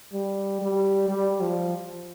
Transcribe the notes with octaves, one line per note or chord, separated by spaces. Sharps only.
G3
G3
G3
F3